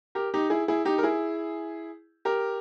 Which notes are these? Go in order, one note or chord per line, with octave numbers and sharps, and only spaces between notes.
G4 A#4
D#4 G4
E4 G#4
E4 G#4
D#4 G4
A#4
E4 G#4
G4 A#4